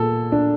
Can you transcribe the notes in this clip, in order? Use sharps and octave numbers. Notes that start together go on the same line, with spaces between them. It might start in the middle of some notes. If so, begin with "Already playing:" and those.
Already playing: A#2 A4
D4